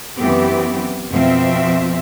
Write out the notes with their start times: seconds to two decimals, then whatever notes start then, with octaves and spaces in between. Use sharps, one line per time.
0.16 F#2 E3 B3 C4 G4
1.11 F2 B2 F3 C4 E5